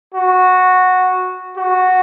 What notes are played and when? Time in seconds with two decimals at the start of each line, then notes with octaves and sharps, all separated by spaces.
0.14 F#4
1.58 F#4